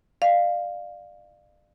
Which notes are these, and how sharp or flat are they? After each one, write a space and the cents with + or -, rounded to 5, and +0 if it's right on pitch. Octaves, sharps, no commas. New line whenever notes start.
D5 +40 F5 +0